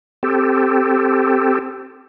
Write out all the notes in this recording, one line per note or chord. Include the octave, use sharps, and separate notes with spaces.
C4 G4 A4